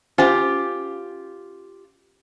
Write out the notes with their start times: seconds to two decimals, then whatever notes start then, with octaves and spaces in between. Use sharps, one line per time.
0.18 C#4 F4 G4 C5 G#5